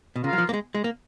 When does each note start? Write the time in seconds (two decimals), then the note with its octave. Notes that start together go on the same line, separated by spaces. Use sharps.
0.16 B2
0.24 C#3 F4 A#4 F5
0.33 F#3
0.38 F3
0.49 A#3
0.54 G#3
0.75 G#3
0.84 A#3